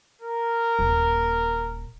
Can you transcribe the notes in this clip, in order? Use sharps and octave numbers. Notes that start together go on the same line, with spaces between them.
A#4
D#1 A#3